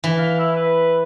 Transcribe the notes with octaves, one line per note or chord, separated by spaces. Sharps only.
E3
F5
E4
B4